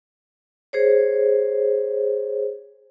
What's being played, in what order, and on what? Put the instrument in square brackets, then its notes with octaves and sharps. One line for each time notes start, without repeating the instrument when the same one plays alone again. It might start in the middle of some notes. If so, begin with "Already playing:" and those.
[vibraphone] G#4 C5 C#5